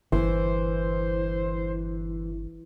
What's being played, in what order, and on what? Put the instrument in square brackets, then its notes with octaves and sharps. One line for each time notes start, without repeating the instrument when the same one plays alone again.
[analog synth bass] G1 [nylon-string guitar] E3 [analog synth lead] C5